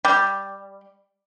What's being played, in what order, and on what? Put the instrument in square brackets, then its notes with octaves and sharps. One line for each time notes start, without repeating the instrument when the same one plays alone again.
[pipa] G3